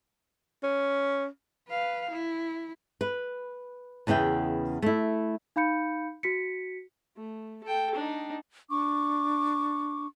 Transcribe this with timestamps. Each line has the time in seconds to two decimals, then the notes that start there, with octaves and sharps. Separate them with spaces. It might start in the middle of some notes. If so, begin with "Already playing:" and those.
0.63 C#4
1.69 B4 F5
2.10 E4
3.01 B4
4.07 E2 C#3 B3 E4 G5
4.82 A3 E4
5.56 D#4 F5 B5 G6 C#7
6.23 F#4 B6 C#7
7.16 A3
7.64 A4 G5
7.95 D4 D#4
8.69 D4 C#6 D6